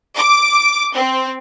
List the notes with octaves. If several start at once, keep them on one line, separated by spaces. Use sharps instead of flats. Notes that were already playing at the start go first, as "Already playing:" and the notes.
D6
C4